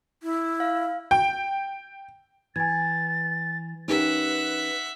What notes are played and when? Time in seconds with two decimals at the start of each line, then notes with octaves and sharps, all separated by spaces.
0.23 E4
0.60 F5
1.11 G5
2.56 E3 G#5 G#6 A6
3.88 C#4 D#4 G4 A#4 B4 E5 F#5